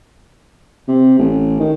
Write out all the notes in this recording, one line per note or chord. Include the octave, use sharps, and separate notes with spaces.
C3
A1
D#3